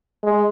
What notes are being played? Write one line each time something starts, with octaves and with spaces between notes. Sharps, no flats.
G#3